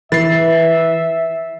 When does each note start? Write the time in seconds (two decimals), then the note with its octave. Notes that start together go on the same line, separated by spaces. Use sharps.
0.12 E3 B4 E5 A6 C7